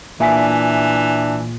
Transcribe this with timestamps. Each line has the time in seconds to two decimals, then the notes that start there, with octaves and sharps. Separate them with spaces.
0.20 A#2 E3 D4 E5 G#5 B6